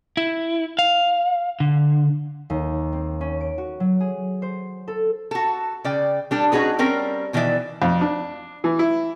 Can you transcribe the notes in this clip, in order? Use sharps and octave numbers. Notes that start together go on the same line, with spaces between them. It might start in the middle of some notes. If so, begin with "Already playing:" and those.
E4
F5
D3
D#2
C4
C#4
D7
F#4
F#3
G#4
C5
A4
F#4 A4
C#3 D5 G5
G3 D4 A4
C#4 D#4 F#4 G#4 B4
G3 C4 C#4 A#4
B2 D#3 E3 A4 D5 E5
F2
D4
E3
E4